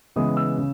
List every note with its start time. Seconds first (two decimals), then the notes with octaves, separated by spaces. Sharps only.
0.16 C#3 E3 G#3 B3 D#6
0.37 E6
0.58 C#3